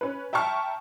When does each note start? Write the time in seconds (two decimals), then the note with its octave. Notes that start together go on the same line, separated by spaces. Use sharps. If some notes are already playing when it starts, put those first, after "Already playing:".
0.01 C#4 B4
0.33 E5 G5 A5 A#5 C#6 F6